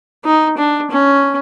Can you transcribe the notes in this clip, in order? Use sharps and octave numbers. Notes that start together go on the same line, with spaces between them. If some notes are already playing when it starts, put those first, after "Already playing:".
D#4
D4
C#4